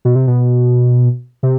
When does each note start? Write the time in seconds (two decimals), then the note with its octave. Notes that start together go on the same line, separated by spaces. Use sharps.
0.05 B2
0.15 C3
0.27 B2
1.43 C3